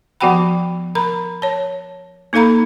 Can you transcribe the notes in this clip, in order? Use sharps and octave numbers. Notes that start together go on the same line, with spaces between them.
F3 B3 F#4 F#5 G5 B5
A#4 A#5 B5
C#5 A5
A#3 D#4 A4 F5 A#5 B5